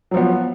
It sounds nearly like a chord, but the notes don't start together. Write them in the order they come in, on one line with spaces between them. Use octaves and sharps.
F#3 F3 B3